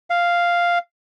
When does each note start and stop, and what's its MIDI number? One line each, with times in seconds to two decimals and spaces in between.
0.10 0.78 77